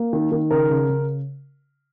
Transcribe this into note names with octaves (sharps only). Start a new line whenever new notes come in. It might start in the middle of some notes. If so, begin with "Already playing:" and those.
Already playing: A#3
D#3
D#3
C#3 A#4
C#3
C#3